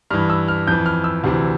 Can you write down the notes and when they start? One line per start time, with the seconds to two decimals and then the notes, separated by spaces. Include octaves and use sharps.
0.10 G2 E3 F6
0.30 E6
0.48 F6
0.67 F2 E3 G6
0.86 F6
1.04 E6
1.24 D2 C3 E3